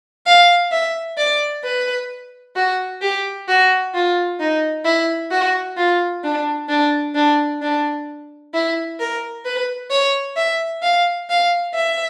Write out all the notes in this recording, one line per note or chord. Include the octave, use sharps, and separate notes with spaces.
F5
E5
D5
B4
F#4
G4
F#4
F4
D#4
E4
F#4
F4
D4
D4
D4
D4
E4
A#4
B4
C#5
E5
F5
F5
E5